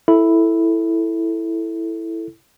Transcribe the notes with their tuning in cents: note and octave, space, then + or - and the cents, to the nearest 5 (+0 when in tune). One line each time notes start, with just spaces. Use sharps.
E4 +0 A4 +0